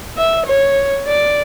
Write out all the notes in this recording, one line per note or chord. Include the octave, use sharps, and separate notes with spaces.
E5
C#5
D5